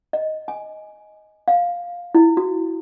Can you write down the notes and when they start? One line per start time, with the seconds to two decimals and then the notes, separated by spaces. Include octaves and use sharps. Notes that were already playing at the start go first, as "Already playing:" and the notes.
0.13 D#5
0.48 G#5
1.48 F5
2.15 E4
2.37 F#4